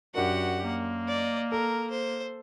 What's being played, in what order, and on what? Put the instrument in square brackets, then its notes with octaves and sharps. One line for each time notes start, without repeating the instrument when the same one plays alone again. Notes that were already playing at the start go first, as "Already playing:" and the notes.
[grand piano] F#2 D4 A#4 [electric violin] F#4 G4 [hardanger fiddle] F#5
[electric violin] A#3
[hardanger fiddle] D5 D#5
[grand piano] A4 [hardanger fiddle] A#4
[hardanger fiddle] C5